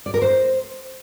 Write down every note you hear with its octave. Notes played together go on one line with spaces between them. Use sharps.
D5
A#4
C5